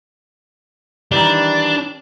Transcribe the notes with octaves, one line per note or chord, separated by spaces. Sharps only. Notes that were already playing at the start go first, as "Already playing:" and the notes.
D#3 E3 G3 D4